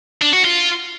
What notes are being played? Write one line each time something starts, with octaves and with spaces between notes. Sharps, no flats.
D4
F#4
F4